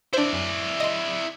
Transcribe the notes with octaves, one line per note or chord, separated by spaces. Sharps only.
D4 E4 C5 D5
F#2
D#5 C6